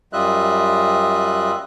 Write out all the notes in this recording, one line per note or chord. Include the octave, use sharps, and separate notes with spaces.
F#2 G3 F4 D#5 E5 F#6